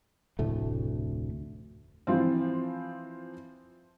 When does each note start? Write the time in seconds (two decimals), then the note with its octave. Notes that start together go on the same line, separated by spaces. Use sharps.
0.39 F1 D2 A2 A3
2.07 E3 F3 C4